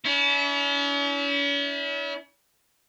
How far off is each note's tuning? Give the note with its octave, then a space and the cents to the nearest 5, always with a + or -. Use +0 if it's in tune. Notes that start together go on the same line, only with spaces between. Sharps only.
C#4 +40 E4 -30